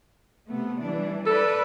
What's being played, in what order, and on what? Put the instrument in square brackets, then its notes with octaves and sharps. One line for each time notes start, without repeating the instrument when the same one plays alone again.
[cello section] C3 A3 B3
E3 G3 D4
[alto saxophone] A4 [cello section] B4 D5